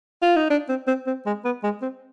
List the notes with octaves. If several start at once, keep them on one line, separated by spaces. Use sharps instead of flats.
F4
D#4
D4
C4
C4
C4
G#3
B3
G#3
C4